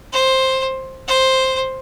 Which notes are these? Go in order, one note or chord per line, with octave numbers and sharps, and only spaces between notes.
C5
C5